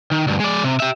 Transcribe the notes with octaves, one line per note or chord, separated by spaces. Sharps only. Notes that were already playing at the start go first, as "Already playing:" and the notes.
D#3
D2 G2
G#3 D5
C3
G4 E5